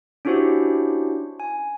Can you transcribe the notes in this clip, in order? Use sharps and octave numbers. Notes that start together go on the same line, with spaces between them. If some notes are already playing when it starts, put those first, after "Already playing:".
C#4 D4 E4 F#4 G4 C5
G#5